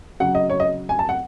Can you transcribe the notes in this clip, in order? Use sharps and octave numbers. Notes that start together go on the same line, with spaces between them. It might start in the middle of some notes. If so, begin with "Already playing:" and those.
C#3 F#3 F#5
D#5
C#5
D#5
G#5
A5
F#5